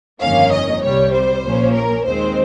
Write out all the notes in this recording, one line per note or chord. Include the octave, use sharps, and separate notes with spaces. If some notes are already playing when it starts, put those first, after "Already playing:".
G1 F2 D#3 A#3 C#4 F5
D#5
C2 C3 G3 C#5
C5
A#1 A#2 F3 A#3 C#4
A#4
D#2 D#3 G#3 C4 C5